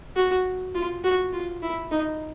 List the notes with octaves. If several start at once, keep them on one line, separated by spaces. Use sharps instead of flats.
F#4
F4
F#4
F4
E4
D#4